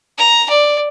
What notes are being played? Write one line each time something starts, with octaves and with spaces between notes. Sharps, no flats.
A#5
D5